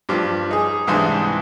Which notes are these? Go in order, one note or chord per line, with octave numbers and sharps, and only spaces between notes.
G2 F3 D6
D#4 G#4
C2 G#2 E3 D4 C6 D#6